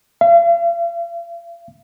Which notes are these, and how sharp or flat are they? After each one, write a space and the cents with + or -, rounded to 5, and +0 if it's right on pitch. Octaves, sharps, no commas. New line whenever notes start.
F5 -40